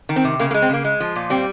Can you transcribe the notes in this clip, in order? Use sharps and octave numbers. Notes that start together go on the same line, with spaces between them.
D#3
C4
C3
C#3 A#3
A#3
G#3
C4
C#3 A#3
G#3
F3
A#2
G3 C4